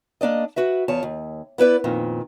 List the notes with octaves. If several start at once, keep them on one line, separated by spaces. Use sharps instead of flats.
A#3 D4 D5 D#5
F#4 B4 E5
E2 F4 C#5 A5
D#2
B3 E4 B4 D5
F2 A#2 D#3